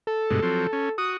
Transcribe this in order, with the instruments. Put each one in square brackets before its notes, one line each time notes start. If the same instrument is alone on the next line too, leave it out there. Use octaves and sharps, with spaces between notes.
[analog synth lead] A4
[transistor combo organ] G2 B2 G#3
F3 F#3 C4
C#4
[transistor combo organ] F#4 [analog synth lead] D#6